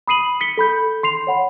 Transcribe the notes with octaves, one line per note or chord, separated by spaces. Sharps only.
B5 D#6 C7 D#7 F#7
B6 C#7 G7
A4 B5 G6
C6 C7 F7
C#5 F#5 B5